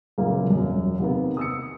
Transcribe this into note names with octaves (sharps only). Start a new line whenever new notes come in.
F#2 A#2 C#3 A#3 B3
E1 F#2
C3 D#3 A#3 B3
D#6 E6 C#7